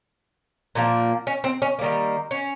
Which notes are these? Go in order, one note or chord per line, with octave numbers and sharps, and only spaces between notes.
A#2 F3 A#3
C#4
C4
C#4
D#3 G3 A#3
C#4